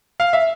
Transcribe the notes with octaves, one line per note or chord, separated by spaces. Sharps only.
F5
E5